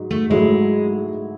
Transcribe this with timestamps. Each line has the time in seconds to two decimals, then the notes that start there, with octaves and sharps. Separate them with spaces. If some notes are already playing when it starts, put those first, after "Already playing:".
Already playing: G#2 F#3
0.11 A3
0.30 G#2 F#3 G#3 A3 E4